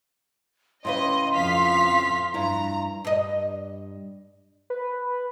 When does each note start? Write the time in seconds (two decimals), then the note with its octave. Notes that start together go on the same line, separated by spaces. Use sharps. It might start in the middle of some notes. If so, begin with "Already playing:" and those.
0.85 A2 C#3 B4 D#5 C6
1.32 F2 F5 B6
2.34 G2 E4 A#5
3.05 G2 D#5
4.70 B4